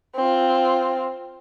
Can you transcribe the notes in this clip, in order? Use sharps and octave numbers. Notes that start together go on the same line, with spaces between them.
C4 F4